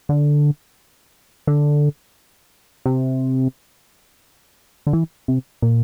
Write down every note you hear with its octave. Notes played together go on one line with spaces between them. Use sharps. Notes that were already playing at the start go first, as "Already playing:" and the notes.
D3
D3
C3
D3
E3
C3
A#2